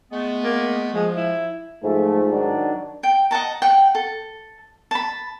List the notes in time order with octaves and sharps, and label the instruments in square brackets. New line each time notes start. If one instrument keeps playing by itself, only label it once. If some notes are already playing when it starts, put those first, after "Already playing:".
[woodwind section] G#3 A3 B3
[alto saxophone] A#3
[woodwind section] F3 [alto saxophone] G#3
[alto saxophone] E4
[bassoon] G#2 [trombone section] F3 A3
[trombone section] D#3 F#3 D4
[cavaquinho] G5
D#5 F#5 A5 A#5
F#5 G5
A4
A5 B5